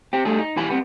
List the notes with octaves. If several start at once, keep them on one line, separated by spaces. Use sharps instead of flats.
C4 G4
G3 A3 D4 G#4
D#4
B1 E3 G3 G#5 B5
G3 B3 C4